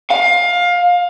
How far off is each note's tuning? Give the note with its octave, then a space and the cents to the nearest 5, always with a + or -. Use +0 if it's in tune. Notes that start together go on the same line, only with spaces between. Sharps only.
F5 +20